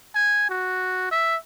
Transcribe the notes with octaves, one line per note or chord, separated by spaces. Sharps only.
G#5
F#4
E5